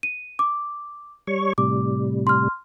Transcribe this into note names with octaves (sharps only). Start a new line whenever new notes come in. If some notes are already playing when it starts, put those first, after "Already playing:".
D#7
D6
G3 C#5 C#6
A2 C3 G3 D6
C6 F6